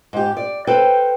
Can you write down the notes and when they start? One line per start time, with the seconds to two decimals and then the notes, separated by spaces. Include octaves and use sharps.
0.13 G#2 G4
0.37 D5
0.67 A4 B4 C5 G5